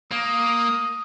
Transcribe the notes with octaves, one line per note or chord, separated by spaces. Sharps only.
A#3 D#6